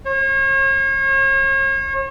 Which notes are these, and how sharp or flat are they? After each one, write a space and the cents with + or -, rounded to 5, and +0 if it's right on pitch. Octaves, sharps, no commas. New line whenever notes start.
C#5 -40